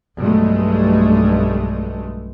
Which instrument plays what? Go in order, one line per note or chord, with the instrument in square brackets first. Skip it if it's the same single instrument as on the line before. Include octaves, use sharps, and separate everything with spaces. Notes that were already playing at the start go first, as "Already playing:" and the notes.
[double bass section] B1 G2 G#3 A3